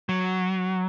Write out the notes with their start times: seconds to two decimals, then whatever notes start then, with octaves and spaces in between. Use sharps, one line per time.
0.09 F#3